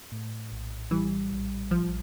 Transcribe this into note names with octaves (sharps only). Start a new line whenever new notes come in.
A2
A#1
E3 G3
A#1
A1 F3